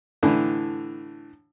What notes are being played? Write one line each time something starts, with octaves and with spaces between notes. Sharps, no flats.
A2 D3 E3